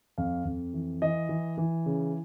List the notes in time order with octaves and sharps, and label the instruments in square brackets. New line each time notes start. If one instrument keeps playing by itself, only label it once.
[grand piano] F2 F5
F2
E3
E3 D#5
E3
E3
C#3